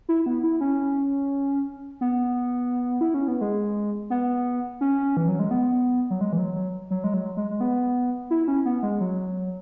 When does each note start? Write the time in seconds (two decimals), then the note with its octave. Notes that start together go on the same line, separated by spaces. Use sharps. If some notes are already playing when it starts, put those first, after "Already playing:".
0.09 E4
0.26 B3
0.44 E4
0.61 C#4
2.01 B3
3.01 E4
3.14 C#4
3.28 B3
3.41 G#3
4.10 B3
4.81 C#4
5.17 E3
5.28 F#3
5.39 G#3
5.51 B3
6.10 F#3
6.21 G#3
6.33 E3
6.38 F#3
6.56 F#3
6.91 F#3
7.04 G#3
7.14 F#3
7.37 G#3
7.51 G#3
7.61 B3
8.31 E4
8.48 C#4
8.66 B3
8.83 G#3
9.00 F#3